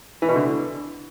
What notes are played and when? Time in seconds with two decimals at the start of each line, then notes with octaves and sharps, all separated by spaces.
0.22 E3
0.29 B2
0.36 D3